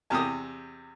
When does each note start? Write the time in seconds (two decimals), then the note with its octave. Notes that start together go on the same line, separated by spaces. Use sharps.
0.10 E2 C3 G4 D#6